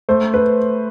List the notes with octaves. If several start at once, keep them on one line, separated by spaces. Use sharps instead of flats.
A3 C5
B4